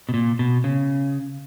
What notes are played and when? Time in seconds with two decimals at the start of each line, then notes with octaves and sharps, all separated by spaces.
0.09 B2
0.14 A#2
0.39 B2
0.64 C#3